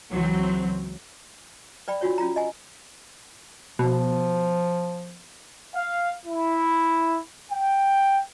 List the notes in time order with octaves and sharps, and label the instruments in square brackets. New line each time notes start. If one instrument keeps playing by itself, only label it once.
[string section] C#2 E3 F#3 C4
[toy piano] B4 D5 G5 B5
D4 F4 F#4 C#5
C#4 F4 A#5
D#5 G#5
[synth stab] B2 [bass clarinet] F3
[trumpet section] F5
E4
G5